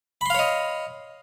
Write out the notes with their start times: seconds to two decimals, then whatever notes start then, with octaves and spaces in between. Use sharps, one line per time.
0.21 B5
0.26 C6
0.30 F5
0.35 C#5
0.39 D#5